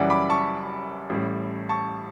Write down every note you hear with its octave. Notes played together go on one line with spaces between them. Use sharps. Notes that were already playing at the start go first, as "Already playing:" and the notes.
Already playing: F#1 F#2 E3 G3 D5 F#5
B5 D6
A5 C#6
A1 A2 G3
A5 C#6